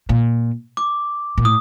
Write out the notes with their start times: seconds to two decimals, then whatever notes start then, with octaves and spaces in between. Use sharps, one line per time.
0.09 A#2
0.77 D6
1.38 A#2
1.44 A2 D#6